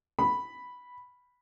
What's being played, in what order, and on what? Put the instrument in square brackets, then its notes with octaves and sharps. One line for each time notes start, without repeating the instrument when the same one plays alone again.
[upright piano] B5